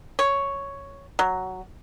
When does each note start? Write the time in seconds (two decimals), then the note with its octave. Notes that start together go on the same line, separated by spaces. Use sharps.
0.19 C#5
1.19 F#3